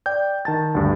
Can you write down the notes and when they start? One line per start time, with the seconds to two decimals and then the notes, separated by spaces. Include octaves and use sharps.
0.06 D5 G5 G6
0.45 D#3 A5 A6
0.75 D2 G2